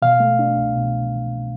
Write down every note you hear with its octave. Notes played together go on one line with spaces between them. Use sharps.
B2 F5
A3
D4
C2
B2